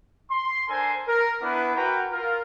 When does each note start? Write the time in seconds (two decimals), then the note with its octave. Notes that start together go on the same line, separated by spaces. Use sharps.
0.31 C6
0.69 D4 A4 A#4 C5 G#5
1.08 A#4
1.42 B3 D4 E4 B4
1.76 F#4 A#4 B4 F#5 G5 A#5
2.12 F4 A#4